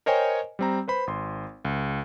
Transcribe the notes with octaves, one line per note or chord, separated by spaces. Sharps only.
A#4 C5 C#5 D#5 G5 G#5
G3 C4 A#5
B4 C5 B5
G#1 C6
C#2